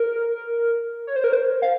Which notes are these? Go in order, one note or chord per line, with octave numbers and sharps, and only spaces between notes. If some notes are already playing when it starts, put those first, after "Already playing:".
Already playing: A#4
C#5
C5
A#4
C5
F5